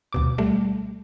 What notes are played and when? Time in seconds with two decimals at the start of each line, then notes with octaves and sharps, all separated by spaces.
0.13 D2 B2 D6
0.38 G3 A3